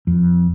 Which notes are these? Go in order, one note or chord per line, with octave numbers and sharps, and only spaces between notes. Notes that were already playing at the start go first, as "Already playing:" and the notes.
F2